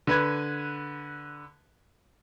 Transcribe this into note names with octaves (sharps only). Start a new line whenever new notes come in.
D3 B4 G#6